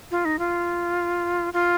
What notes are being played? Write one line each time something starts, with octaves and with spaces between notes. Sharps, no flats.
F4
D#4
F4
F4